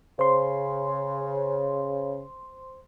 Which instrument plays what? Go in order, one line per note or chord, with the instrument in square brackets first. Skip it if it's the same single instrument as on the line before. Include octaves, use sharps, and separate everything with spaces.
[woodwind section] C#3 [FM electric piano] C5 C6